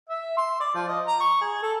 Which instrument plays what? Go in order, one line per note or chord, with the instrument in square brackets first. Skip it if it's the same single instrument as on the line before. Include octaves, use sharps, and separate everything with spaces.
[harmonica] E5
C6
D5
F3
D#5
A#5
C#6
G#4
A4